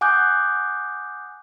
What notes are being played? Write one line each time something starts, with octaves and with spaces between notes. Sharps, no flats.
F#5 G#5 D6 D#6 F#6 G6